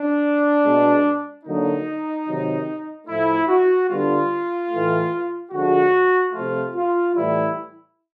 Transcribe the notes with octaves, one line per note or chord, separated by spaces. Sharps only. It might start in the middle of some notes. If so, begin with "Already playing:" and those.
Already playing: D4
B2 G#3 B3
D3 F#3 A#3 D#4
C3 D#3 F#3
A2 F3 A3 E4
F#4
D3 G3 B3 F4
A2 E3 A3
D3 F3 G#3 F#4
C3 F3 A3 F4
F4
A2 E3 G3 E4